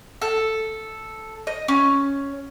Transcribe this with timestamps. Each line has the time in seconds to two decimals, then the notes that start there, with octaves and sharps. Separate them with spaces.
0.22 A4
1.47 D#5
1.68 C#4